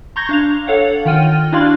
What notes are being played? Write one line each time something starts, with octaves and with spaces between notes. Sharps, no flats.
A#5 C6 C#6 G6 G#6 A#6
D4 F5 F7
A4 C#5 F5 F#5
D#3 F4 G5 F6 D#7
D4 E4 F#4 D5 F5 C6